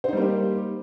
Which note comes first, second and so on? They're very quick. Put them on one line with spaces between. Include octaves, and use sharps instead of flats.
C5 D#4 G3 A#3 G4